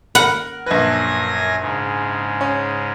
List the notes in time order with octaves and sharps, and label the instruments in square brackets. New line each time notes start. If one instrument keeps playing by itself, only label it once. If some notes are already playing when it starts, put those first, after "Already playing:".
[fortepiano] A#4 [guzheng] F#5 [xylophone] B5
[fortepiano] A#1 B4 [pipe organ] F#2 G#5 A#6
[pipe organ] G#2 C#3
[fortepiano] C#4